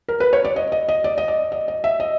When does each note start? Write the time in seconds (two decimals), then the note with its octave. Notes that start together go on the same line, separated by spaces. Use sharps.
0.09 A#4
0.20 B4
0.33 C#5
0.45 D5
0.56 D#5
0.72 D#5
0.89 D#5
1.04 D5
1.18 D#5
1.28 D5
1.52 D#5
1.68 D#5
1.84 E5
2.00 D#5